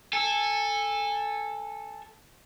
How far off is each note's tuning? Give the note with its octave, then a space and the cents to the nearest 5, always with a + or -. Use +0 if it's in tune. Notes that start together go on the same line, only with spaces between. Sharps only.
A4 +0 G#5 -20